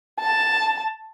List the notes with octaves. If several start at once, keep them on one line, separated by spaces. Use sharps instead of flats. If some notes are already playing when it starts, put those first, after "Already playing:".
A5